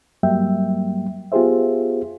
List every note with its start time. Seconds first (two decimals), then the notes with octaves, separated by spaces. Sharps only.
0.23 G2 F#3 G3 A#3 E5 G5
1.32 B3 F4 G4 G#4 C5 E5